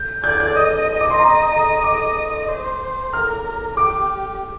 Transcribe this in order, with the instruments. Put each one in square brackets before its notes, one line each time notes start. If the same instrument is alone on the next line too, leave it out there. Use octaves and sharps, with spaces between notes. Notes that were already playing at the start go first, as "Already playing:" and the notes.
Already playing: [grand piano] G6
[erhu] D5 [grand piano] G6
[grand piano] G#6
G6
[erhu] D#5 [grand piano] D#6
[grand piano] D6
C6
A#5
A#5
D6
[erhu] C5
[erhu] A#4 [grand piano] F6
[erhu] G4 [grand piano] D6